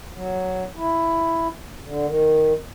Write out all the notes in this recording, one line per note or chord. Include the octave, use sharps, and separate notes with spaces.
F#3
E4
D3
D#3